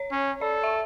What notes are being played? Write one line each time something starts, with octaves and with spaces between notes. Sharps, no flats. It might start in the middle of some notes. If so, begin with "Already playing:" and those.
Already playing: C#5
C#4
A4 D5
E5